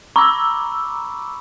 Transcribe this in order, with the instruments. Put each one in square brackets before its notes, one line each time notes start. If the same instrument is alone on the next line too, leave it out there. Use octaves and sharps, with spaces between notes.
[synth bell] A#5 D6 E6 [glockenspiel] B5 C#6